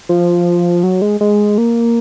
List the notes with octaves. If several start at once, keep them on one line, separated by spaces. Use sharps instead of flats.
F3
F#3
G#3
G#3
A#3